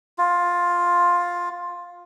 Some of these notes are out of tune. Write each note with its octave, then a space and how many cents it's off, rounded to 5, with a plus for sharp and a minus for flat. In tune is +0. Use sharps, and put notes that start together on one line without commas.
F4 +10